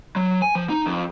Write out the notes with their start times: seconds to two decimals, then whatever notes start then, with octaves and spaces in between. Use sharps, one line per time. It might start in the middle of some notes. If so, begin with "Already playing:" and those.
0.16 F#3
0.42 G#5
0.55 F3
0.70 D#4
0.86 F2